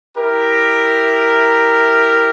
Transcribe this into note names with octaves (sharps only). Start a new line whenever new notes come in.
E4 G4 A#4